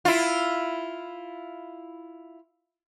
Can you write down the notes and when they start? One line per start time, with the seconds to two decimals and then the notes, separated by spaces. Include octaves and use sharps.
0.05 E4 F4